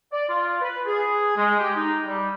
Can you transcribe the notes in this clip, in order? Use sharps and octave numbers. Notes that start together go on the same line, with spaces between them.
D5
F4
B4
G#4
G#3
G4
D#4
G3